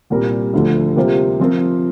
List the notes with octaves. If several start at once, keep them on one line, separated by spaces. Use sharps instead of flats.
C2 A#2 G3 C4 A#4
D2 D3 F3
C3 G3 A#3 F4 C5
F3 C4 F4 A#4